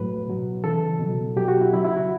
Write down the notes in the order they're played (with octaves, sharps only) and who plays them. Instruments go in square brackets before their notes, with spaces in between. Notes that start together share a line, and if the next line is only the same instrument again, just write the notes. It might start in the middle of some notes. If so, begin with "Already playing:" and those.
Already playing: [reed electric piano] A2 F#3 B4
B2 F#3
C#3 E3 A4
B2 F#3
B2 F#3 G4
F#4
E4
C#3 F#3 E4
E4
F#4